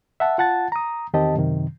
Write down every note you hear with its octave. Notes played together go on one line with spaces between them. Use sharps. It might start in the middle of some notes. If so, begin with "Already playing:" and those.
E5 F#5 A5
F4 F#5 A5 A6
A#5 D#6
E2 D#3 C4 G4 D#5 A5
F#2 C3 D#3